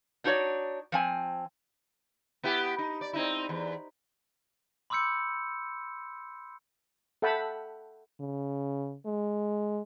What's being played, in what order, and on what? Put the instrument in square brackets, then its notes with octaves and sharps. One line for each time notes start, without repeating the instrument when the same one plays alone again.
[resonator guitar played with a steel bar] D4 D#4 F#4 A4 C#5 D5
F3 C4 G#5
[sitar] B3 E4 G4
D#4
D5
C4 D#4 E4
E2
[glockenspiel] B5 C6 D6 E6 G6 C#7
[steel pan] A4 E5 F#5 G5 A5 B5
[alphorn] C#3
G#3